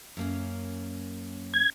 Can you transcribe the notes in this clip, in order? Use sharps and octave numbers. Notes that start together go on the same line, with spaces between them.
F#2 A#3 C#4
G#6